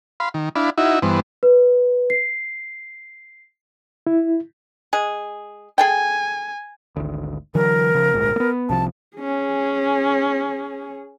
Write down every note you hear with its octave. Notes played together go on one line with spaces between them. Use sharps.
F5 B5 C6
D#3
D4 E4 F5 B5
D#4 E4 F#4 E5
G2 E3 B3 C5
B4
C7
E4
G#3 G#4
G#4 A4 G5 G#5
G#1 D2
D3 E3 F#3 A#4
C#3 F3
D1 A#1 G#2
A#3 B3
C2 C3 F3 A5
C#4 G#4